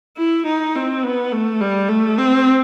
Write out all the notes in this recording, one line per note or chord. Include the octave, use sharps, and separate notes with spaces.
E4
D#4
C4
B3
A3
G3
A3
C4